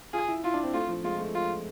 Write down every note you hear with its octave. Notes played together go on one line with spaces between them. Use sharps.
F4 G#4
E4
E4 F4
D4
C4
A3 F4
F3
G#3 F4
A3
F4